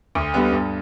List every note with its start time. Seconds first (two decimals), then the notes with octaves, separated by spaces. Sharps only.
0.15 D2
0.34 D3 G3 B3
0.52 G2